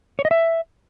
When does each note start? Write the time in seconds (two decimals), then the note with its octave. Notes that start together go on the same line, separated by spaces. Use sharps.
0.19 C#5
0.25 D#5
0.31 E5